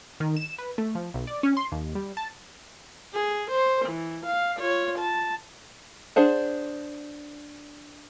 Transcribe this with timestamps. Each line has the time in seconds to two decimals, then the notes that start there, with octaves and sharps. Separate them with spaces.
0.20 D#3
0.37 E7
0.58 B4
0.78 A3
0.95 F3
1.14 B1
1.27 D5
1.43 C#4
1.57 C6
1.72 D#2
1.95 G3
2.17 A5
3.13 G#4
3.51 C5
3.86 E3
4.26 F5
4.58 F4 C#5
4.99 A5
6.16 D4 G#4 C5 F#5